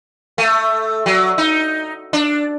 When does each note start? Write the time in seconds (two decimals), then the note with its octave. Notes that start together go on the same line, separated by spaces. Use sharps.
0.38 A3
1.06 F#3
1.38 D#4
2.13 D4